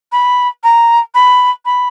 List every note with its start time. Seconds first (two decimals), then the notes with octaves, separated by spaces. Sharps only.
0.12 B5
0.63 A#5
1.14 B5
1.65 B5